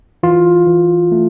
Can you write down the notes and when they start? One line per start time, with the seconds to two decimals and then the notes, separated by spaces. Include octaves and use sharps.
0.23 E3 F4
0.67 E3
1.12 A3